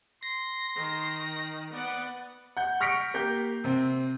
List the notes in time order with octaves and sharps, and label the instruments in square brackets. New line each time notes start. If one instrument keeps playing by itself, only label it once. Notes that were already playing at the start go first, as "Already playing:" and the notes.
[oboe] C6 [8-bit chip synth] A#6
[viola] D#3
[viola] B3 F#5 [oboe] D5
[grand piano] F#5 G6
C#6 F6 A#6 B6 C#7 D7
A#3 G4 G6
C3 C4